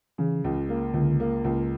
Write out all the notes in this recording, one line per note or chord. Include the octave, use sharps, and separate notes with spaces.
C#3 E3
C#2
A#3
C#2 D3
A#3
C#2